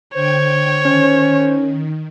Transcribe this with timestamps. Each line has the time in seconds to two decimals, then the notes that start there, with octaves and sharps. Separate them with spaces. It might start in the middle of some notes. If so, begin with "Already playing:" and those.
0.14 D3 C5 C#5 G5 G#6
0.86 D#3 C#4